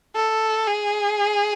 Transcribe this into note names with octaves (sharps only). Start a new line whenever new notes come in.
A4
G#4